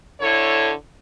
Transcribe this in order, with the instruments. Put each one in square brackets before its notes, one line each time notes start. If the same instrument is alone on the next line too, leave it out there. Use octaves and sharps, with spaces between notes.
[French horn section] D3 E4 A4 C#5